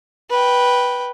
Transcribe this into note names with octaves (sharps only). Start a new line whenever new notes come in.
B4 G5